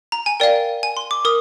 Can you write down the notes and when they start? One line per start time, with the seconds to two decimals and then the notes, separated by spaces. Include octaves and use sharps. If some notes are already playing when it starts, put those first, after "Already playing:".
0.12 A#5
0.26 G#5
0.40 A#4 D5 F5 G5
0.83 G#5
0.97 C6
1.11 D6
1.25 A#4 D#6